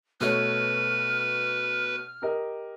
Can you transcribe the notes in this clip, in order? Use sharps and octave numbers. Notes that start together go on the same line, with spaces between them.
B2 A3 B4 C#5 F6
G4 A#4 D#5